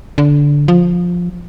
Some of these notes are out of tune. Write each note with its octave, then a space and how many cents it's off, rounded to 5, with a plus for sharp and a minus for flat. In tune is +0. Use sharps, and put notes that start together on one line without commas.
D3 -15
F3 +10